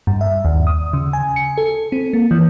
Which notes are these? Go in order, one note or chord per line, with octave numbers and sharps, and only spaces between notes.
G2
E5
D#2
D#6
C#3
G#5
C#7
A4
C4
A#3
E3